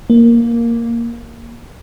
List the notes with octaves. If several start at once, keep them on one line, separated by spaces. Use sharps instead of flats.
A#3